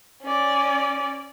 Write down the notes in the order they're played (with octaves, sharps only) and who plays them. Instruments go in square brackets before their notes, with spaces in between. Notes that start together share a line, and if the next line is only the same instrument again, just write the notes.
[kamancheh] C#4 D5